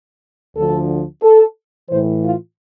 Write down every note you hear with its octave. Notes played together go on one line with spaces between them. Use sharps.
D2 D3 F3 A4
A4
A2 E3 C5
F4